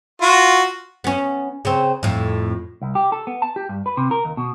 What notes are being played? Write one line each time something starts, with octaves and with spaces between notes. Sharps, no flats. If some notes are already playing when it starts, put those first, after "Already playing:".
F4 F#4
B3 C#4
C#3 C4
F2 A2
C2
G4
A4
B3
A5
G4
G2
B4
C3
A#4
D#2
B2